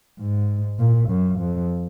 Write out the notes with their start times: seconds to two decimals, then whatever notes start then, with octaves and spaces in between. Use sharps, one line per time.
0.20 G#2
0.80 A#2
1.09 F#2
1.39 F2